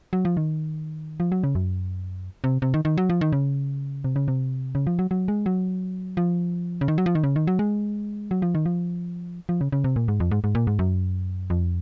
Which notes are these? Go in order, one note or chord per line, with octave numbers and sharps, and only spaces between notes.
F#3
F3
D#3
F3
F#3
C#3
F#2
C3
C3
D#3
D#3
F#3
F3
D#3
C#3
C3
C#3
C3
C#3
F3
F#3
F#3
G#3
F#3
F3
C#3
D#3
F#3
F3
D#3
C#3
D#3
F#3
G#3
F#3
F3
D#3
F3
F3
C#3
C#3
C3
A#2
G#2
F2
G#2
G#2
A#2
G#2
F#2
F2